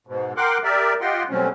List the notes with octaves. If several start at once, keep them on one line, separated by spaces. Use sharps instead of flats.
G#2 B2
A#4 F#5 G5 C6 D6 F#6
G4 A#4 D5 E5
F4 G4 D#5 F#5 G5 C6
B2 F#3 G3 A3 C4 C#4